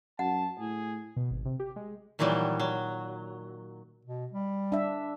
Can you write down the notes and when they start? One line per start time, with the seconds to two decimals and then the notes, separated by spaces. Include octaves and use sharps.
0.19 F#2 F#5 A5
0.59 A2 G#4
1.16 B2
1.30 G#1
1.45 C3
1.60 G4
1.76 G#3
2.19 A#2 D#3 E3 F#3 G3
2.60 F#3
4.05 B2
4.32 G3
4.72 D4 E5